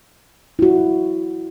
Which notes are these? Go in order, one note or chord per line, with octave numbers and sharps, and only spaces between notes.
E4 F#4